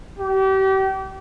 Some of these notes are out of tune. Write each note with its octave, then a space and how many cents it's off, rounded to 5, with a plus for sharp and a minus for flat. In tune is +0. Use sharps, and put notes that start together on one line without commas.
G4 -35